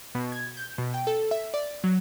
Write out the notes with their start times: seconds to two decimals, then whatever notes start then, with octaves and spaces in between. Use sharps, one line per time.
0.15 B2
0.32 G#6
0.57 G6
0.78 B2
0.94 G5
1.07 A4
1.31 E5
1.54 D5
1.84 F#3